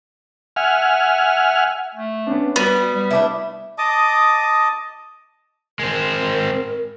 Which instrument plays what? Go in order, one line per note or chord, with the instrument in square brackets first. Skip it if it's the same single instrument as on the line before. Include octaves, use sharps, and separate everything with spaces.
[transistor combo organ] E5 F#5 G#5 F6
[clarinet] A3
[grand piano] B3 C#4 D4
[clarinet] G3 [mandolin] B3 [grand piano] F#4 F#7
[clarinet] G3
[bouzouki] A3 D4 E4
[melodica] D#5 A5 D6 D#6
[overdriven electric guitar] G#3 C4 [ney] A#4